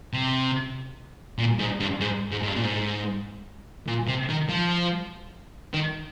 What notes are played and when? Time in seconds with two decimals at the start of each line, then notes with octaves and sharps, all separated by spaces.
0.13 C3
1.39 A#2
1.59 G#2
1.80 G2
2.01 G#2
2.32 G#2
2.43 G#2
2.48 G2
2.57 A#2
2.63 G#2
3.87 A#2
4.08 C3
4.29 D#3
4.50 F3
5.74 D#3